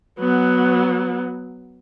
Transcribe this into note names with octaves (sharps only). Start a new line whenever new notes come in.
F#3 B3